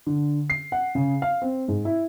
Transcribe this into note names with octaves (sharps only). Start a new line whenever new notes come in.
D3
C7
F#5
C#3
F5
C4
G#2
E4